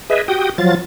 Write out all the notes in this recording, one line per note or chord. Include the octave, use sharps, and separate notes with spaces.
G#4 B4 D#5 E5
F#4 G4 G5 D#6
F3 F#3 F4 A6